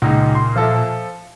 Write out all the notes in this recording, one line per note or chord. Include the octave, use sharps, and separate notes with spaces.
C#2 A#2 D#4
C6
F3 A4 E5